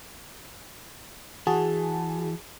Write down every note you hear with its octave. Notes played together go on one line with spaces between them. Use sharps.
E3 F#4 G#4 A5